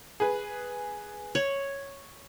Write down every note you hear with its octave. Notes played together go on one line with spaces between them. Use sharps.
G#4 B4
C#5 F#7